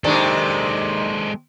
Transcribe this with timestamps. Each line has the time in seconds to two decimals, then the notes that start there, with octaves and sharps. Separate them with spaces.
0.04 C3 D#3 G#3 D4 A4